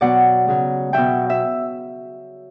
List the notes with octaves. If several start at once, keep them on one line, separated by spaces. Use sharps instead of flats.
B2 F#3 D5 F#5
C#3 F#3
B2 F#3 E5 G5
E5